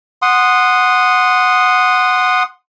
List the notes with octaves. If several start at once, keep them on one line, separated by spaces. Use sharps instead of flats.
F#5 C6 D#6